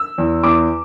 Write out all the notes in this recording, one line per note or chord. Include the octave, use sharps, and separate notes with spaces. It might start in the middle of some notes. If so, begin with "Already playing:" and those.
Already playing: E6
E2
E2 D6